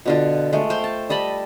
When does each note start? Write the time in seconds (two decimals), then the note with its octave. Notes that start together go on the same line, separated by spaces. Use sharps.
0.06 B2 D3 F4
0.53 G#3 A3
0.70 C5 F5 G5 C6
0.84 A5
1.09 G3 D#5 A5 B5